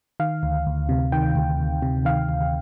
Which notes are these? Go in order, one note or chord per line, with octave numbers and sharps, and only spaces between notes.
D#3 F5
D2
D2
C3
D#3 G5
D2
D2
C3
D#3 F5
D2